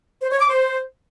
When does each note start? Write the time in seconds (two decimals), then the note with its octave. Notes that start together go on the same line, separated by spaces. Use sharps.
0.22 C5
0.31 C#5
0.40 D6
0.49 C5